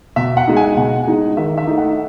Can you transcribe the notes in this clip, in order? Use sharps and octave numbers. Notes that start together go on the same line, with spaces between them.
B2 E5
F#5
G#3 D#4
G#5
B2 F#5
G#3 D#4
D#3 E5
E5
A3 D#4
F#5